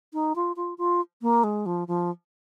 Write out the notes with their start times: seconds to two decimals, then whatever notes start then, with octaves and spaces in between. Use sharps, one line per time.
0.13 D#4
0.36 F4
0.56 F4
0.78 F4
1.22 A#3
1.44 G#3
1.66 F3
1.88 F3